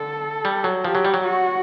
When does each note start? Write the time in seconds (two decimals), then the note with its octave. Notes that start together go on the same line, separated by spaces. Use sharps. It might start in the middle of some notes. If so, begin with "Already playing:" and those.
Already playing: D3 A4
0.45 G3
0.64 F#3
0.84 F3 G4
0.95 F#3
1.05 G3
1.14 F#3
1.24 F#4